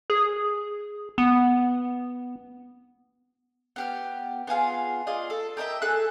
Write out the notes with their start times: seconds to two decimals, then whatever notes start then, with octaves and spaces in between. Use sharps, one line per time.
0.10 G#4
1.18 B3
3.76 B3 G4 F6
4.47 B3 F4 G#4 F5
5.07 F4 G#4 D5 D#5
5.30 A4
5.57 G4 A#4 D#5 E5
5.82 G#4 A4 E6 F#6